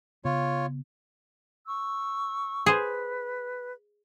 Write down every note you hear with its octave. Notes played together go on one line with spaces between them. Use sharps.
C#3 B3 F4 C#5
C#6 E6
G#4 B4 C5